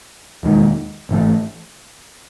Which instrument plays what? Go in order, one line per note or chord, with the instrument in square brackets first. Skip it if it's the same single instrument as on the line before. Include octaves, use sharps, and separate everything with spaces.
[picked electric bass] E1 D#2 D#3 G#3
A1 G#2 E3 A3